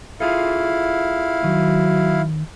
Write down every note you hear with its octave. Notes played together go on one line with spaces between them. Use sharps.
E4 F4 G#4 A4 F5
D#3 F#3